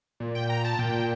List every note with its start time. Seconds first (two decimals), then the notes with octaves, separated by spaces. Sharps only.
0.20 A#2
0.35 G5
0.50 A#5
0.64 A5
0.79 A#2 G5